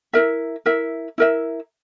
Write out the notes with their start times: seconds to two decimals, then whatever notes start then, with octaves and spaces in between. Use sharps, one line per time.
0.13 E4 A#4 E5
0.66 E4 A#4 E5
1.18 E4 A#4 E5